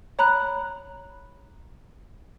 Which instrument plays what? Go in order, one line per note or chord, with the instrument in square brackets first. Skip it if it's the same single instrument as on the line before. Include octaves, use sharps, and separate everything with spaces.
[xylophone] C#5 A#5 B5 F#6